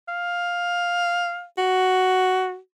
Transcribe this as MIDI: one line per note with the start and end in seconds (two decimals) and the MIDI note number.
0.08 1.44 77
1.58 2.57 66